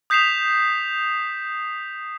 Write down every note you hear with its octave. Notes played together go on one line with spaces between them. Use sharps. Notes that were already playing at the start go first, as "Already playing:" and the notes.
D#6 G6 B6 C7 E7 F7